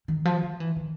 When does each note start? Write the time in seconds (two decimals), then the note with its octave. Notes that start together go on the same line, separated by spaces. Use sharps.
0.08 D#3
0.25 F3
0.42 F3
0.60 E3
0.77 D#3